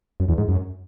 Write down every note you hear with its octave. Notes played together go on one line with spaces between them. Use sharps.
F#2
E2
G#2
F#2